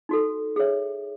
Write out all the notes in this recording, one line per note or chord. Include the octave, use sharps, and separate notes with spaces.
D#4 F#4 A4
G#4 C#5 E5